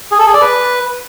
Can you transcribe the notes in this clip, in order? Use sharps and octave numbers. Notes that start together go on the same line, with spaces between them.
G#4
A4
G#4
D5
B4